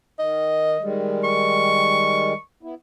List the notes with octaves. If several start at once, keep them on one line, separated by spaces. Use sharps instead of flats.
D#3 D#5
D#3 G3 G#3
C#6
B3 E4